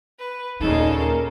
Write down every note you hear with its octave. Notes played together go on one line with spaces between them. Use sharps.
B4
D#2 A#2 C#3 A#3 D#4 A4
A#4